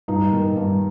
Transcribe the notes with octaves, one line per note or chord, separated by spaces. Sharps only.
G2 D#4
D#3
G2